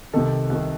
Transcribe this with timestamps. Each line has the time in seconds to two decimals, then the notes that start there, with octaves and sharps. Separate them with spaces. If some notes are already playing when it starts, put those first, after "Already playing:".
0.13 C2 C3 D#3 A4
0.50 C2 C3 D#3